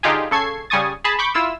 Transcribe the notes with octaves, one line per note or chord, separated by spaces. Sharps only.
D3 D#4 F4 G4 G#4
C#3 A4 C#6 G#6 C7
C#3 G3 G#5 C#6 D#6 A6
G#4 A5 B5
B5 C#6 D6 G6 B6
E4 F4 E6